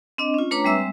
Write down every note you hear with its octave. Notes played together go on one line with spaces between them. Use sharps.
C4 D4 D#5
C#4 F4
A3 D4 B4 C#5 A#5 D6
G3 G#3 C4 E5 E6